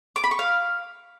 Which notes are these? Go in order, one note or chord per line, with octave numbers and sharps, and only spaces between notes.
D6
B5
C#6
F5